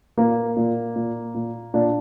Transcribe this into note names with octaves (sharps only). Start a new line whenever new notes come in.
A#2 A#3
A#2
A#2
A#2
A#2 D4